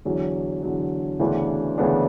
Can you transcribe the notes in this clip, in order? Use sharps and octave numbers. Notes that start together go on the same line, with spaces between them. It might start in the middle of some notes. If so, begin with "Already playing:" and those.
E2 D3 F#3
E2 D3 F#3
D2 C#3 E3 B3 D4
D2 C#3 E3 B3 D4